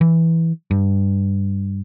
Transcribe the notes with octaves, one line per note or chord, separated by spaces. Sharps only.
E3
G2